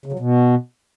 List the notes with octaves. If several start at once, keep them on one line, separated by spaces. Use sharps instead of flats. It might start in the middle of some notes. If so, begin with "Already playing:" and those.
C#3
F#3
B2